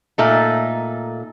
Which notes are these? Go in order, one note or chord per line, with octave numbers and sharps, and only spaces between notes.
A#2 A3 D#4